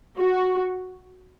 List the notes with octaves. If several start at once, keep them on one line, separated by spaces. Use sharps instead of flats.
F#4